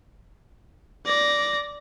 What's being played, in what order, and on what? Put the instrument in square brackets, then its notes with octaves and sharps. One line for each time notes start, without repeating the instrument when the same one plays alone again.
[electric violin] D5 A#6